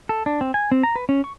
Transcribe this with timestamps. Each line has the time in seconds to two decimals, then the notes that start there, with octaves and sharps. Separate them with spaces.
0.09 A4
0.26 D4
0.41 C4
0.54 G#5
0.71 C4
0.83 A#5
0.96 B4
1.09 C#4
1.24 C#6